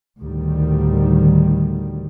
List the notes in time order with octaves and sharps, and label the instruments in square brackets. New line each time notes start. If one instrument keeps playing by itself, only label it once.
[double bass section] D2 A2 D#3 G3